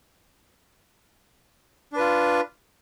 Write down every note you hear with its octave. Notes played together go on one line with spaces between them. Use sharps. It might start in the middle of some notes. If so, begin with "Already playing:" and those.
D4 F4 B4